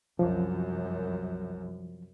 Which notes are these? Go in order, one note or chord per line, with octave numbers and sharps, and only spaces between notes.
C2 F#2 F3